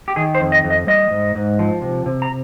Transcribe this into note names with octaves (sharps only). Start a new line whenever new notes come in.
G4
D#3 G#4
C5
F2
D#5
F2
D#5
G3 D#5
G#2
G#2
F3
C3
C3
A#5